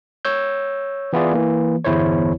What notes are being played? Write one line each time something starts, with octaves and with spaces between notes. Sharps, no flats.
C#5 E6 G6
E3 B3 E4 F4 G#4 D5
E3 A#3
G1 E2 E4 C5 C#5